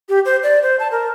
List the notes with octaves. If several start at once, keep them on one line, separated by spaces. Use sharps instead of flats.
G4
C5
D5
C5
A5
A#4